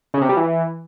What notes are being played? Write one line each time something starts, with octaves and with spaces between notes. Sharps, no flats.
C#3
C3
G3
E3